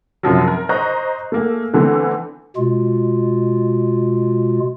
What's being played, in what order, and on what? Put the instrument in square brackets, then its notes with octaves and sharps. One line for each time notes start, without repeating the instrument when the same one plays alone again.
[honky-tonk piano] F#2 C3 F3 F#3
A#4
C5 D#5 A#5 C#6 F#6
A3 A#3 G#4
D3 E3 A3 B3 C4
[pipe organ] B2 G#3 F4